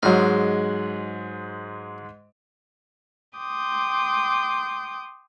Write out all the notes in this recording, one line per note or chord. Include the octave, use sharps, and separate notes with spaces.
G#2 F#3 G#3 F5
G5 C6 D6 D#6 G6